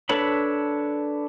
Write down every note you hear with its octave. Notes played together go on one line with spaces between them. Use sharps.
D4 A4 B4 C#5 B5